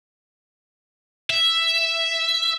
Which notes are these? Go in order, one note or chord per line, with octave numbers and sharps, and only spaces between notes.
E5